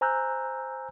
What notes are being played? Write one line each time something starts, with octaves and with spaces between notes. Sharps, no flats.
C5 G#5 A#5 E6 F#6 G6